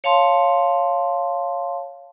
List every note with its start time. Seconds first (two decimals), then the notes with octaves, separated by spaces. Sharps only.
0.04 C#5 F5 A5 C6